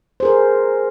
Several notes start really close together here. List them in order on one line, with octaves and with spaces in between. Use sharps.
C5 G#4 A#4